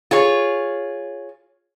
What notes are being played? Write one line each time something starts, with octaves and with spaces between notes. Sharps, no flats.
F4 G#4 C#5